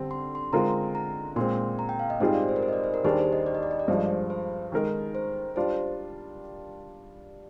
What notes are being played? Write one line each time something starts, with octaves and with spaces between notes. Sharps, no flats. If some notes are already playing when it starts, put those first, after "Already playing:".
Already playing: D3 G3 C4
C6
C6
D3 G#3 C4 F4 A#4 A#5
A#5
A#2 G#3 C4 C6
A#5
G5
F5
D#5
G#2 G3 C4 F4 G#4 C5
D5
C5
A#4
C5
D#5
D5
C5
A#4
D#2 D#3 G3 D4 G#4 C5
C5
D#5
D5
D#5
D5
D#5
D5
G2 F3 G#3 C5
C5
D#3 G#3 D#4 A#4
C5
G3 D4 F4 C5